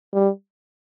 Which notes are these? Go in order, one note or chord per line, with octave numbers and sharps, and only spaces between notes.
G3